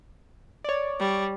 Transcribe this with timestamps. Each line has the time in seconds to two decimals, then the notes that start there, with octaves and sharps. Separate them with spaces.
0.64 C#5 D5
1.00 G3